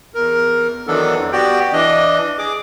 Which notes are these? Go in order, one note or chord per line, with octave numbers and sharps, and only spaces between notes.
E2 A#4
D#3 E3 F#3 B3 D4 A4
F2
B3 F#4 G4 D5 G5
E3 D4 D#5
G#4 D6